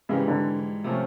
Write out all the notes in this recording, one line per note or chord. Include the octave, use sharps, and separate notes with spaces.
G#2 C#3 E3 G3
D3
C3 F3 A3 C#4